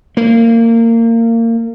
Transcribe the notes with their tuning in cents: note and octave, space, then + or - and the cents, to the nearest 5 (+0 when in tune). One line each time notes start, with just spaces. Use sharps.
A#3 -25